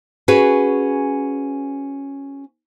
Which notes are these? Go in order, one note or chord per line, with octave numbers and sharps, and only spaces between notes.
C#4 F#4 G#4 B4